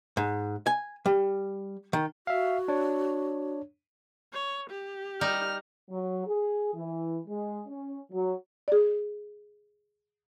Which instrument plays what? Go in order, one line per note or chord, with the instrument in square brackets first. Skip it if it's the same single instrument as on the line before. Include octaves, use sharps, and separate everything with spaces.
[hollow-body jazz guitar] G#2
G#5
G3
D#3
[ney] F#4 [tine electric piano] E5 F5
[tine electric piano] D4 C#5
[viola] C#5
G4
[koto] G3 D#4 [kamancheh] F6
[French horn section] F#3
G#4
E3
G#3
C#4
F#3
[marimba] G#4 D5